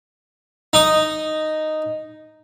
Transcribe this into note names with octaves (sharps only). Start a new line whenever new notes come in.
D#4 D#6